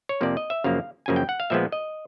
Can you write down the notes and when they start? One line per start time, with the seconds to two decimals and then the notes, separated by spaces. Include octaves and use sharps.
0.09 C#5
0.21 F2 C3 F3 A#3 D5
0.37 D#5
0.50 E5
0.64 F#2 C#3 F3 A#3 F5
1.06 F#2 C#3 F3 A#3 G#5
1.16 G5
1.29 F#5
1.40 F5
1.50 A#2 F3 G#3 B3 E5
1.72 D#5